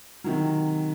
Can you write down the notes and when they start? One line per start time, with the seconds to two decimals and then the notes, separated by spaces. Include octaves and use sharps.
0.24 C3 D#3 F#3